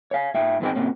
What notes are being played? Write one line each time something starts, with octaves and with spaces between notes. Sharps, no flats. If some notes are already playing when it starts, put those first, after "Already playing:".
C#5 F5
G#2 E5 G5
E2 G#2 C4 G#4 D#5 G5
A#2 C4 C#4